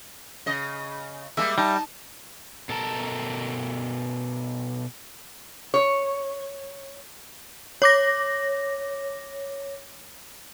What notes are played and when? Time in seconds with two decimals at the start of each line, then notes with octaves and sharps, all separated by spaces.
0.46 C#3 D#5
1.37 G3 G#3 A#3 E5
1.58 G3 D#4 A5
2.69 B2 A4 A#4 A5
5.74 C#5
7.82 C#5 D6 A#6